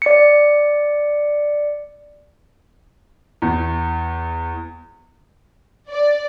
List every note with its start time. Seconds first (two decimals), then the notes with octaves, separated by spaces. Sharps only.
0.02 D5 C#7
3.42 E2
5.89 D5